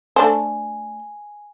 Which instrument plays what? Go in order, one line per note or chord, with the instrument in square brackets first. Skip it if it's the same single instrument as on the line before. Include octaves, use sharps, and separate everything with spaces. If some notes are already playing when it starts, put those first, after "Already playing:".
[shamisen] A3 D4 C5 [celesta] G#5